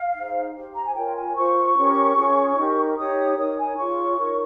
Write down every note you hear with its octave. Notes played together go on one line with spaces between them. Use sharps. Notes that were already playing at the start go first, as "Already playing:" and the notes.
Already playing: F5
D#4 G#4 C5
G4 C5
A#5
G#5
F4 A#4 C#5 G5
G#5
F4 C5 C#6
C#4 G4 A#4
C#4 F4 G#4 C#5
D#4 G4 A#4
D#4 G4 C#5 D#6
D#4 A#4 C#5 D#6
G#5
F4 G#4 C#5 C#6
D#4 A#4 C#5